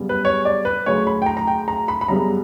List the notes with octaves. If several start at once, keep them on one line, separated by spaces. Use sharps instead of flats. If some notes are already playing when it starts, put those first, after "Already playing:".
Already playing: F#2 C#3 G3 B3
B4
C#5
D5
B4
D2 C#3 F#3 C#5
B5
G5
A#5
A#5
G5
A#5
B5
B5
F#2 C#3 G3 B3 A#5